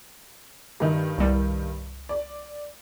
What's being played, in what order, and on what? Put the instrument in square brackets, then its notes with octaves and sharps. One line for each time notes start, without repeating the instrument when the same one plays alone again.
[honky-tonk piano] G2 D#3 D#4 [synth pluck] A3
[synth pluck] C2 G3
[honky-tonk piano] D5